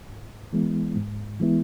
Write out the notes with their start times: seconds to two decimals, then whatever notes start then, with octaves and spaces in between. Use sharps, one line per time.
0.09 G#2
0.53 E3 G#3 B3 E4
0.96 G#2
1.40 E3 G#3 B3 E4